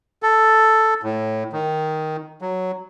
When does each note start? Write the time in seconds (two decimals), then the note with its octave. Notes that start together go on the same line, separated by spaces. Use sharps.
0.23 A4
1.03 A2
1.53 D#3
2.42 F#3